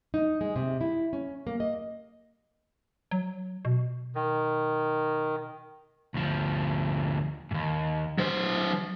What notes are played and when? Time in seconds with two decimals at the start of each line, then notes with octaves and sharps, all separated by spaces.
0.14 D#4
0.41 G#3
0.56 C3
0.81 E4
1.13 C#4
1.47 A#3
1.60 D#5
3.11 F#3
3.65 B2
4.15 D#3
6.14 D2 F3
7.51 D#2 G#2
8.18 F#3 C5